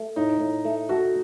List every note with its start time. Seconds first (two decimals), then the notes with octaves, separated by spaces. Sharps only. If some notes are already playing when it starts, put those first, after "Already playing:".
Already playing: A3
0.16 A2 D#4
0.41 A2
0.65 A3
0.89 F#4 A4